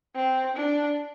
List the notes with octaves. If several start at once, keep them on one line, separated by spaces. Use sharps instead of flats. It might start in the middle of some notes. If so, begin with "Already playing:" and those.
C4
D4